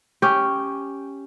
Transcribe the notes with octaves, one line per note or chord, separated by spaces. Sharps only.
C#4 G4